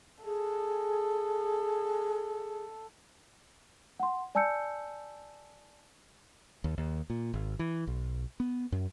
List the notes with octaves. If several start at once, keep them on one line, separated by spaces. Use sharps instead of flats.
G#4 A4
F#5 C6
D5 G#5 A5 E6 G6 C#7
D#2
D#2
A#2
G#1
E3
B1
B3
F#2